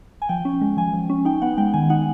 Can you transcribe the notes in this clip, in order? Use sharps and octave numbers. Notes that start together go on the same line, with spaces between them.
G#5
F3 G5
C#4
G#3
F3 G#5
F3
C#4
D#4 G5
B3 F#5
G#3 G5
D#3 G#5
D#4 F#5